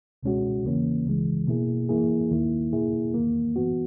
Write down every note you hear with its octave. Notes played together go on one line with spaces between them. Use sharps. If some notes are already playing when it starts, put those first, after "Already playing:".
C#2 B2 G#3 C#4 F#4
E2 C#3 E3 A#3 C#4
C#2 C#3 E3 G#3
B2 A#3 E4 G#4
F#2 E3 A#3 E4 G#4
D#2 D#3 A#3 E4
E2 B2 A#3 E4 G#4
E2 D#3 A#3
F#2 E3 B3 F#4